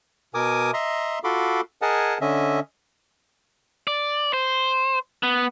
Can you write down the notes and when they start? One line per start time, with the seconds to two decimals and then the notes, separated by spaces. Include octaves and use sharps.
0.34 B2 A#4 G#5 D6 D#6
0.74 D#5 E5 A#5 C6
1.24 F4 F#4 A4 B5 C6 D6
1.82 G#4 A#4 D#5 F#5 G#5 A5
2.21 D3 C#4 D#5 E5
3.87 D5
4.33 C5
5.23 B3